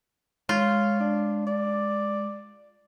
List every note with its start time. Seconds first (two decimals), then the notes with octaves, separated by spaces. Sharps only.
0.49 G#3 F4 C#5
1.00 D4
1.47 D5